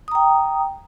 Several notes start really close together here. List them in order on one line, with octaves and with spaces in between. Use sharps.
D#6 A#5 G5